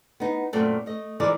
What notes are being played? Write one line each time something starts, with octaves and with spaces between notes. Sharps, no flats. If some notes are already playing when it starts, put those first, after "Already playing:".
B3 D#4
F#2 A#2 A3 C4 C#4
A3 D#5
E3 F3 G#3 E4 A#4 D5